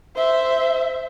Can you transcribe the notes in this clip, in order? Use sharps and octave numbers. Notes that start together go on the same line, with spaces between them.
C5 E5